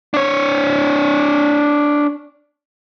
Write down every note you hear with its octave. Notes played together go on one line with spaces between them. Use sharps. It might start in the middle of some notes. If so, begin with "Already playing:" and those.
D4 C#5